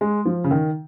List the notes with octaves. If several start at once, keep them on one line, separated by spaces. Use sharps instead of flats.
G#3
F3
C#3
D#3